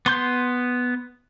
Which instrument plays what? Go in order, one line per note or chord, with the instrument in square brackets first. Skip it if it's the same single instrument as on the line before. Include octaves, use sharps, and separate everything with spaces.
[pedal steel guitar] B3 C6 G6